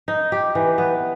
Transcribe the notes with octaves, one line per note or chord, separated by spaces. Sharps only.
D#4
G4
E3
B3